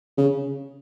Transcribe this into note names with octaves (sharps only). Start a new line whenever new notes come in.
C#3